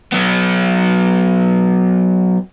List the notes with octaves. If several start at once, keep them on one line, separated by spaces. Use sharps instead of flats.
F#3 B3